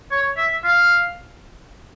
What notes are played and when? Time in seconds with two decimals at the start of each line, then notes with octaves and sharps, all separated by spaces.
0.11 C#5
0.37 E5
0.64 F5